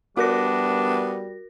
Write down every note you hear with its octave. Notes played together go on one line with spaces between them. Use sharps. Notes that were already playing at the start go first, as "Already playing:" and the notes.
G3 B3 D4 F#4 A#4 A#6